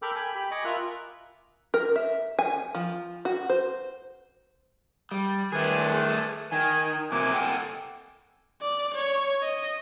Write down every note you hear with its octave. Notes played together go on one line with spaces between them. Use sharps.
A4 A#4 G5 B5 D6 F6
G5 G#5 B5
G4 B5
D#5 G#5 B5 C#6 D6
F4 A#4 E5 F6 F#6
A#4
E5
G#5
F3
F#4
C5
G3
E2 D#3 A3 D4 G#4
D#3 G#5
C3 A#3 G#5 D6
A4 F#5 G5
D5
C#5
D#5